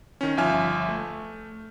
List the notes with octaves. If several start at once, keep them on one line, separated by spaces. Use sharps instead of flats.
D#3 C#4
G1 F3 E5 G#5 F6
A3